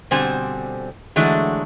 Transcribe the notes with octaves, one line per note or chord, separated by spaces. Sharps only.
B2 D3 G3 C4 C5 G#5
D3 E3 F#3 G#3 A3